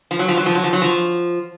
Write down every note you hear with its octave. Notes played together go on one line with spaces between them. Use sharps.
F3
F#3
F3
F#3
F3
F#3
F3
F#3
F3